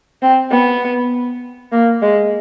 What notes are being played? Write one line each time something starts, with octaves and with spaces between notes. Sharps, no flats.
C4
B3
A#3
G#3